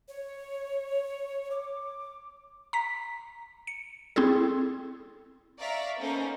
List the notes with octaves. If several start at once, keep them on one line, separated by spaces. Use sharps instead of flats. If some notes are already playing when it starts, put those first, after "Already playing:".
C#5
D6
A#5 B6
C#7
C4 E4 G#4 A4
D5 E5 F5 A#5 C#6
A#3 B3 C#4 D#4 A4 C5